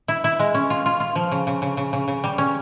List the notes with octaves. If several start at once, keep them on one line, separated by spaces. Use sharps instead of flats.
E4
E4
G#3
C#4
F4
F4
F4
F3
C#3
C#3
C#3
C#3
C#3
C#3
G3
C#4